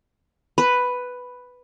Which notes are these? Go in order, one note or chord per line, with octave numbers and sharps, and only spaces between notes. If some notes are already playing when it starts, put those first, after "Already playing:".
B4